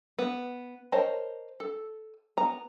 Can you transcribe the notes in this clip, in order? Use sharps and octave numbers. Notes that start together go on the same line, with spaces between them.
B3
A#4 C5 C#5 D#5 A5
A4
B3 A#5